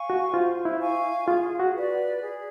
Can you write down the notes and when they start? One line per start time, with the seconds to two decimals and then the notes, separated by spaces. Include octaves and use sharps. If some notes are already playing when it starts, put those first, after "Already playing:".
Already playing: F5 G#5 C#6
0.10 F#4
0.33 F4 C5
0.65 E4
0.80 F5 G#5 C#6
1.27 F4 G#4
1.60 F#4
1.75 B4 D5
2.22 G#4